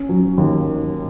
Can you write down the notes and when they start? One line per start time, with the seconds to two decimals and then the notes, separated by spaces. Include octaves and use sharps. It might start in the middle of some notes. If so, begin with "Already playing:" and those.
Already playing: C#4
0.09 F#3
0.38 D#2
0.65 D#3